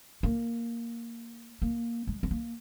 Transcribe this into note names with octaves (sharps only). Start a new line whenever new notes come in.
A#3
A#3
G#3
C4
A#3